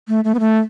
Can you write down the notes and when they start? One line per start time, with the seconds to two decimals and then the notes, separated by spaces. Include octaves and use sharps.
0.08 A3
0.24 A3
0.34 B3
0.40 A3